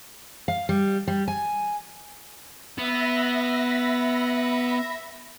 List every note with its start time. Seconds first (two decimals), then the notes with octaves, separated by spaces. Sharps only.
0.48 F5
0.69 G3
1.08 G3
1.28 G#5
2.78 B3 E5 B5 A#6